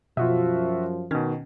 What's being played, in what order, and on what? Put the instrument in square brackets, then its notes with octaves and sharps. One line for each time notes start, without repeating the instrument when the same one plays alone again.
[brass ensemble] F#2 F3 [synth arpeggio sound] B2 [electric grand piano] F4 F#4 E5
[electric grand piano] B2 D#3 [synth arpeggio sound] C#4